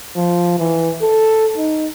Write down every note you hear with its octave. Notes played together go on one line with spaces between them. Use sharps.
F3
E3
A4
D#4